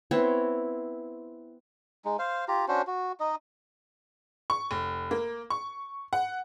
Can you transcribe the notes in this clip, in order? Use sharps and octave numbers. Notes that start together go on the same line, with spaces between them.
B3 C4 E4 C#5
G#3 D#4
C5 F5
F4 G4 A#5
C#4 D4 F#4 C5
F#4
D#4 D#5
C#6
F1
A#3
C#6
F#5